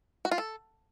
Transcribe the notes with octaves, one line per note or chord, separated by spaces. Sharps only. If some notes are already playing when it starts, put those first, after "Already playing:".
F#4
F4
A4